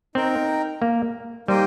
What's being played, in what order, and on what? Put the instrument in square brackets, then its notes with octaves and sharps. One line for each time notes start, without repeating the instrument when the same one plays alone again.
[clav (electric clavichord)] C4 [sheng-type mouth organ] D#4 A#4 G5
[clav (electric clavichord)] A#3
[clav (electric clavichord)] G3 [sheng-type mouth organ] A#3 D#4 C5 D#5 G5